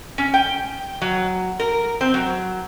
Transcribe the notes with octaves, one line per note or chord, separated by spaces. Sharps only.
C#4
G5
F#3
A#4
C4
F#3